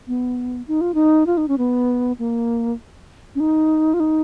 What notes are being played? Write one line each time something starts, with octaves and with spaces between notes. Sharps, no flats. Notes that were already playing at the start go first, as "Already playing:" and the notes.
B3
D#4
F4
D#4
F4
D#4
C#4
B3
A#3
C#4
D#4
F4
D#4